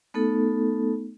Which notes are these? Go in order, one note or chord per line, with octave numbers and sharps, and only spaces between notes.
A3 B3 D#4 A4